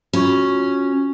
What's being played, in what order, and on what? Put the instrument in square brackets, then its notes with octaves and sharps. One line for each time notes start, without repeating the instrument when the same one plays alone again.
[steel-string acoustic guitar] C#4 [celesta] F4 F#4 C#6